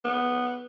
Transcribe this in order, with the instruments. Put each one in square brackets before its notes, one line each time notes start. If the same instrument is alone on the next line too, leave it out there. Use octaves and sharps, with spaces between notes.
[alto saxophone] B3